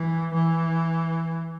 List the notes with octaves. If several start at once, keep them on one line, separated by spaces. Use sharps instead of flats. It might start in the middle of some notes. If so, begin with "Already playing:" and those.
Already playing: E3
E3